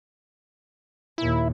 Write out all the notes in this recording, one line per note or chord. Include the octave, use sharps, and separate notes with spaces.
D#2 A#2 E4